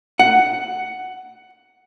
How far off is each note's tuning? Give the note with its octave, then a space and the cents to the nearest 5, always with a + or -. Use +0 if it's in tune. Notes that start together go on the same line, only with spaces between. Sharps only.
F#5 +10